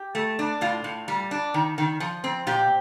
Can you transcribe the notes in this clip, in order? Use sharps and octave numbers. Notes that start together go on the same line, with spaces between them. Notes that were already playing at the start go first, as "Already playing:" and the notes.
Already playing: G4
A3
D4
A2 F4
A2
G3
D4
D#3
D#3
F3
C4
A#2 G4